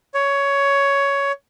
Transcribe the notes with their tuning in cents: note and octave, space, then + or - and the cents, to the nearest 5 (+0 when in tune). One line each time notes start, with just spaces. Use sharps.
C#5 +10